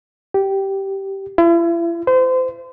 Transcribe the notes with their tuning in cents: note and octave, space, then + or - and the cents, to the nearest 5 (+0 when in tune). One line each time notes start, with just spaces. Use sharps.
G4 -10
E4 +40
C5 -30